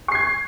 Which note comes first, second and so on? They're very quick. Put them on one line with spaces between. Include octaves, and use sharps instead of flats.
C#6 C7 G#6